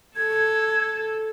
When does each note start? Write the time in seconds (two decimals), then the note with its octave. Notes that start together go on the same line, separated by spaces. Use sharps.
0.17 A4 G#6